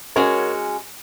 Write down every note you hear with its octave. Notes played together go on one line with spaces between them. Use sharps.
G#3 C#4 F#4 A#4 C#5